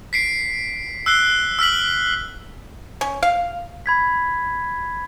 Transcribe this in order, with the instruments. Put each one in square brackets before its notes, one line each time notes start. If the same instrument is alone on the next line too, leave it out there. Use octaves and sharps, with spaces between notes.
[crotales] B6 C7 D7
E6 F#6 C7 G7
E6 F6 B6 F#7
[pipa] C#4
F5
[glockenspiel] B5 G#6 B6